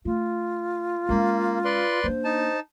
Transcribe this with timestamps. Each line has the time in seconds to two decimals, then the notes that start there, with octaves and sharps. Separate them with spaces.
0.05 A3 F4
1.09 G#3 A#3 C#4
1.65 B4 D5 C6
2.04 A#3 D4 C5
2.24 D#4 A5